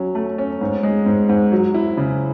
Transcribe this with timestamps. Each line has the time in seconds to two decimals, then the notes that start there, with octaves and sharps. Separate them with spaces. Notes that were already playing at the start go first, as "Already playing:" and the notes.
Already playing: F#3 C#4
0.15 A3
0.38 C#4
0.61 G#2
0.83 G#3
1.06 G#2
1.29 G#2
1.52 F#3
1.74 E4
1.97 C#3